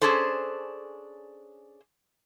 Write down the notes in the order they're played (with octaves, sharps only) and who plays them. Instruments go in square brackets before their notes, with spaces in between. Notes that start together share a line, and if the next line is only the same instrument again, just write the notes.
[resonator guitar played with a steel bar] C#4 D4 G#4 A4 C5